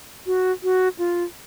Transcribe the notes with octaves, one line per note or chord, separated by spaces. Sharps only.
F#4
F#4
F4